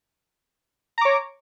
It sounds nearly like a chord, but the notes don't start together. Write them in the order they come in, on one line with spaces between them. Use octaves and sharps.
A#5 D6 C#5